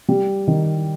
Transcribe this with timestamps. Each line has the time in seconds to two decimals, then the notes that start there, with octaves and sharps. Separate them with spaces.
0.09 G3
0.47 D#3